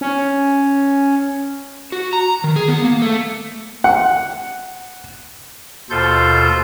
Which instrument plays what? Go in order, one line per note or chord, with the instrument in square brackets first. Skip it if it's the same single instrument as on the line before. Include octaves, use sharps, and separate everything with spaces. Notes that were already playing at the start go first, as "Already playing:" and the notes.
[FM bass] C#4
[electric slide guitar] F#4
A#5
D#3
G#4
B3
A#3
A3
[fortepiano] F#5
[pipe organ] D#2 B2 F4 A4 C5 G6